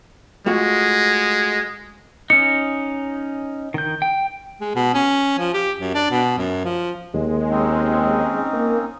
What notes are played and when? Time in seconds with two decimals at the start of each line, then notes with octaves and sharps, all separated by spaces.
0.46 G#3 A3 F4 F#4
2.30 C#4 D#4 C#7
3.74 D#3 G6
4.02 G5
4.61 G#3
4.76 B2
4.95 C#4
5.39 F3
5.54 G4
5.80 F#2
5.95 D4
6.11 B2
6.38 F#2
6.65 F3
7.14 D#2 G#3
7.49 C4 C#4 D#4
8.53 A#3